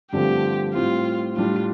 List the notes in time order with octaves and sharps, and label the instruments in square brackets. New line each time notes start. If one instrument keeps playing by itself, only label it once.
[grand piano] G2 D3 F3 A3 C4 [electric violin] G4
[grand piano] A2 G3 C4 [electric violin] F4
[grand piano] A2 G3 D4 [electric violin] F4